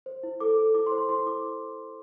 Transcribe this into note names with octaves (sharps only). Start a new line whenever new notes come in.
C5
E4
A4 D6
A4
E4 D6
C6
C5
C6
E4 C6
E4 D6